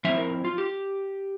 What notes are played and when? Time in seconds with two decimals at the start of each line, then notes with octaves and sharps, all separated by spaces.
0.05 F3 C4 E4 E5
0.17 A#4
0.45 F4
0.58 G4